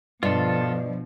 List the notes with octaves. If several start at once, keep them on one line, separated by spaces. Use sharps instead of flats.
G2 B2 F3 F4 A4 B4 D5 D#5